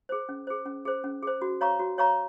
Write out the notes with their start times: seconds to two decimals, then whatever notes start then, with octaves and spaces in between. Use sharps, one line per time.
0.09 G#4 C5
0.29 C#4
0.47 G#4 C5
0.66 C#4
0.85 G#4 C5
1.04 C#4
1.23 G#4 C5
1.42 F#4
1.61 C#5 F5 A#5 C#6
1.79 F#4
1.98 C#5 F5 A#5 C#6